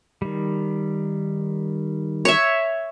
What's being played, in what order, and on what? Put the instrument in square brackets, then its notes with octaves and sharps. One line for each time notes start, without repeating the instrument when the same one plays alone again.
[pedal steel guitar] D#3 G3
[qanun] C#5 E5